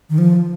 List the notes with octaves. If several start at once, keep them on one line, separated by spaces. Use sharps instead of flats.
D#3
F3